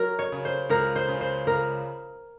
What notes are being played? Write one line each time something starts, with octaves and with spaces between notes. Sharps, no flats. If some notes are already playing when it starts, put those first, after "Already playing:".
Already playing: F#3 F#4 A#4
C#5
C#3
C5
C#2 A#4
C5
C#3
C5
C#2 A#4